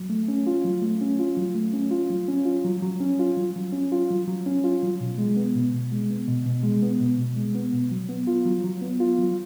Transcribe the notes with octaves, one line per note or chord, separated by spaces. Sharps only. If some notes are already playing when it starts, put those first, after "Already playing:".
Already playing: F#3
A3
C#4
F4
F#3
A3
C#4
F4
F#3
A3
C#4
F4
F#3
C#4
F4
F#3
F#3
C#4
F4
F#3
F#3
C#4
F4
F#3
F#3
C#4
F4
F#3
B2
G#3
B3
B2
B2
G#3
B3
B2
B2
G#3
B3
B2
B2
G#3
B3
B2
F#3
B3
F4
F#3
F#3
B3
F4
F#3